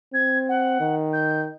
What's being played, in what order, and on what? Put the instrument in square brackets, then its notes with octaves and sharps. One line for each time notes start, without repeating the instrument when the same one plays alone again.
[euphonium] C4 [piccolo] G#6
[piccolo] F#5
[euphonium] D#3
[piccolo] G6